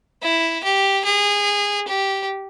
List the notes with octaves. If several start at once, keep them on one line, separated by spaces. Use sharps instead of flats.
E4
G4
G#4
G4